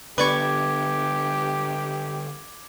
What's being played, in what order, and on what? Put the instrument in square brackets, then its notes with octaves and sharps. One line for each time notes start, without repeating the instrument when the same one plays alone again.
[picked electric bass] D3 B3 [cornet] G4 [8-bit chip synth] B4 D5 C#6 [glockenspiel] D6 G#6